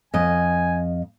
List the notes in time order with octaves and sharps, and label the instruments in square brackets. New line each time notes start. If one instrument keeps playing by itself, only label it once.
[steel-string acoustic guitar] F2 D#5 [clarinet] G#5